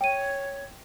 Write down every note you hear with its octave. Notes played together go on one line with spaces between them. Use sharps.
C#5 G5 D#7